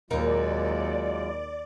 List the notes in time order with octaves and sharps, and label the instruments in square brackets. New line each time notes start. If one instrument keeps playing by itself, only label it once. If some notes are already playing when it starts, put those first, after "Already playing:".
[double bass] D#2 [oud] A#2 D#4 A#4 [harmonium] F#3 G#3 F4 [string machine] D5